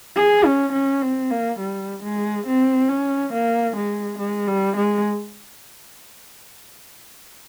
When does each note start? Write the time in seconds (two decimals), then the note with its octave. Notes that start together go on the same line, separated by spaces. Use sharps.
0.16 G#4
0.45 C#4
0.73 C#4
1.02 C4
1.30 A#3
1.59 G3
2.03 G#3
2.47 C4
2.89 C#4
3.33 A#3
3.76 G#3
4.18 G#3
4.48 G3
4.77 G#3